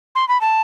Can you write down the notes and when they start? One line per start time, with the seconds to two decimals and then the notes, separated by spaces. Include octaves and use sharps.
0.15 C6
0.28 B5
0.41 A5